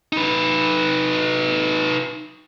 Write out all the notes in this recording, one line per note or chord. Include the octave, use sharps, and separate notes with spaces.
D#4 B4